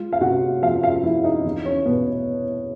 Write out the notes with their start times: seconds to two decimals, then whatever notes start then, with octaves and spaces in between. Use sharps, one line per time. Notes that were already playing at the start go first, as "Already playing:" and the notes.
Already playing: G#3 F4
0.13 F5
0.21 C3 F#4 F#5
0.62 F2 F4 F5
0.82 F4 F5
1.03 F3 E4 E5
1.24 D#4 D#5
1.44 E2
1.65 C#4 C#5
1.86 B2 B3 B4